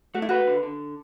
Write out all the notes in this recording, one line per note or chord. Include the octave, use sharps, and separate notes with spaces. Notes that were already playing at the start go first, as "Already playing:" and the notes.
A3 F#4
E4
F#4 B4
D3
D3